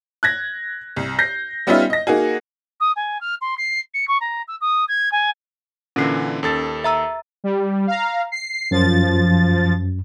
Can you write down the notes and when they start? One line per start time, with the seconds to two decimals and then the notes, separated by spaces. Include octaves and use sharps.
0.23 F#6 G#6 A#6
0.96 C2
1.19 G6 A#6 C7
1.67 G3 B3 C#4 D#4 F4 E5
1.90 D#5 A#6
2.07 A#3 D#4 F#4 G#4
2.80 D#6
2.96 G#5
3.21 F6
3.41 C6
3.58 C7
3.94 C#7
4.08 C#6
4.21 A#5
4.48 E6
4.61 D#6
4.88 G#6
5.12 G#5
5.96 A#2 D3 E3 C#4 C7
6.43 D#2 A4 A6
6.84 E5 A#5 E6
7.44 G3
7.87 F5 A#5
8.32 C7
8.71 F#2 F3 A6